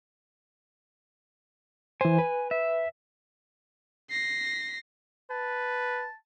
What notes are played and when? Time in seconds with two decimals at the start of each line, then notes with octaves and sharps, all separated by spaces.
2.01 E3 C5 G#5
2.18 B4
2.51 E5
4.10 A#6 C7
5.31 B4 A5